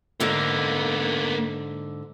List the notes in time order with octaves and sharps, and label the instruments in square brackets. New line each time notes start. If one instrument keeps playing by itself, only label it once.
[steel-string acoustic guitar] G#2 D3 [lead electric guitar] A#3 B3